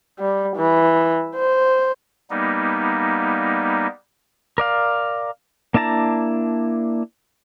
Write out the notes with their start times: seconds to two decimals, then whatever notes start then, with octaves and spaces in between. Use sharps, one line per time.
0.19 G3
0.56 E3
1.36 C5
2.30 G3 A#3 B3 D#4
4.58 A#4 D5 F5
5.74 A#3 D4 E4 A5 A#5